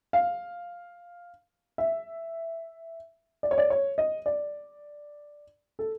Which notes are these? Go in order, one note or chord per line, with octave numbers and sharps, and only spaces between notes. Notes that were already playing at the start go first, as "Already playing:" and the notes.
F5
E5
D5
C#5
D5
C#5
D#5
D5
A4